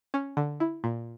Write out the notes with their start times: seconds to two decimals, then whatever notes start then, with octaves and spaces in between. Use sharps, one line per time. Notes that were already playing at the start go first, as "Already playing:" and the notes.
0.14 C#4
0.37 D3
0.60 E4
0.84 A#2